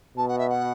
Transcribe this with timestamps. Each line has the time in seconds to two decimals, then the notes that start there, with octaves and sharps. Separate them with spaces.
0.17 B2 A5
0.28 F#5
0.38 E5
0.49 F#5